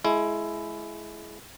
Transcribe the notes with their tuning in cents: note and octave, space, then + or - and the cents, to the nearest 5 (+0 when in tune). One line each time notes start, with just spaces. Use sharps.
G#3 +25 E4 +15